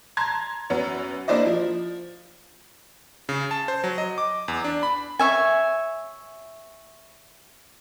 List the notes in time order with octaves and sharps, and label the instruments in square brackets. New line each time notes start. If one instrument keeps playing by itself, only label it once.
[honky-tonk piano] A5 A#5 C6 G#6
F#2 B3 C#4
A#3 D4 E4 C5 D5 D#5
F3
[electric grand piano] C#3
A5
C5
F#3
D#5
D6
E2
D4
B5
[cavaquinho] C#5 E5 G#5